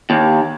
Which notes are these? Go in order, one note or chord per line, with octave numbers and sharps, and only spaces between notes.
D#2